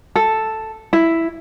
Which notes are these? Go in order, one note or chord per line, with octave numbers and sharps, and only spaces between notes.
A4
E4